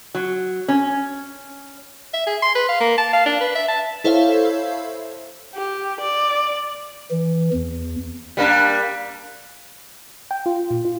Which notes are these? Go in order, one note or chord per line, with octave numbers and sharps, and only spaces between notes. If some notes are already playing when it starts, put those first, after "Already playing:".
F#3
C#4
E5
G#4
C6
B4
F5
A#3
A5
F5
D4
B4
E5
A5
E4 A4 C5 C#5 E5 F5
G4
D5
E3
E2
G3 A#3 D4
G5
F4
A#2
F4